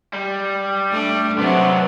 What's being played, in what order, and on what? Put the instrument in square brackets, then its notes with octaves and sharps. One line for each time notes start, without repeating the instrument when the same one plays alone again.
[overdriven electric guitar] G3
[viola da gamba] A3 D4
[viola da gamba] C3 F#3 [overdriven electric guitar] B3 D4